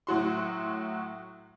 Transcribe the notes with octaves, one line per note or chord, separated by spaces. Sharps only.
A2 F#3 F#4 C6